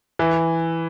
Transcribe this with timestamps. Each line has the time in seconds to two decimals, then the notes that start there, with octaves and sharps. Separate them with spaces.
0.19 E3